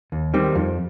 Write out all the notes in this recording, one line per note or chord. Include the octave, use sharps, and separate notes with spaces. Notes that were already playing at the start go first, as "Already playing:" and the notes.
D#2
D#3 G3 C4
F2